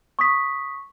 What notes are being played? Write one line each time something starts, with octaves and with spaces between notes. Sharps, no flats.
C#6 D#6 B6